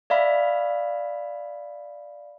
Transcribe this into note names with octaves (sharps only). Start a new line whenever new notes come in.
D5 E5 F5 B5